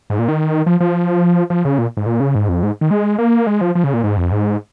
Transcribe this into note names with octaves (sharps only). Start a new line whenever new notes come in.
G#2
A#2
D#3
F3
F3
F3
C#3
A#2
G#2
A#2
C#3
G#2
F2
G#2
D#3
G#3
A#3
G#3
F3
F3
C#3
A#2
G#2
F2
G#2